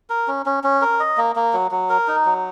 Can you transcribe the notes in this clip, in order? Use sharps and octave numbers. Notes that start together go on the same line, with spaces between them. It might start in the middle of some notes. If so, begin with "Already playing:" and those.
A#4
C#4
C#4
C#4
A#4
D#5
A#3
A#3
F#3
F#3
A#4
D#4
F#3